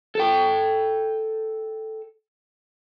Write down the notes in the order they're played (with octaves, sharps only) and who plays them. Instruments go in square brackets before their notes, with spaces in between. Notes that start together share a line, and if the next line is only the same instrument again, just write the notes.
[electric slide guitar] A4 G5